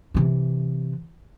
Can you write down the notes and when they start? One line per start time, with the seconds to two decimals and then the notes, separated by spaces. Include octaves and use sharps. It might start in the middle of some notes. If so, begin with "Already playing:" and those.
0.14 C3 E3